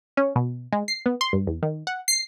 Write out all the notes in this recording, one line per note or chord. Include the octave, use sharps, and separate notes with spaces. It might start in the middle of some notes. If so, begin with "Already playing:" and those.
C#4
B2
G#3
C7
B3
C6
G2
E2
D#3
F#5
C7